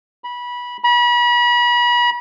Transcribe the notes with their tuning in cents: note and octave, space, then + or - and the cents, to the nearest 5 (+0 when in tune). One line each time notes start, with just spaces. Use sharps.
B5 -20
B5 -35